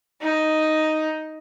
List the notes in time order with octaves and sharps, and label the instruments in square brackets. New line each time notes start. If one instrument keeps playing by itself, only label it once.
[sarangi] D#4